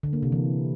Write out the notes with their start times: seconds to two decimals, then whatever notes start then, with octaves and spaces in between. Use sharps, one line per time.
0.03 D3
0.13 A#3
0.23 C3
0.32 E3